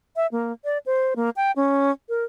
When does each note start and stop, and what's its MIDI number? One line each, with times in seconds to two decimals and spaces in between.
0.16 0.27 76
0.32 0.52 58
0.64 0.78 74
0.86 1.14 72
1.16 1.30 58
1.36 1.51 79
1.56 1.91 61
2.09 2.24 70